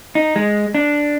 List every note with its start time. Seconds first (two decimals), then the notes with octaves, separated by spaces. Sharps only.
0.15 D#4
0.36 G#3
0.75 D4